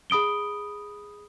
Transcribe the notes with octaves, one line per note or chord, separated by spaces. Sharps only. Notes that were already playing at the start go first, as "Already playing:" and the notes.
G#4 B5 D#6 D7 G7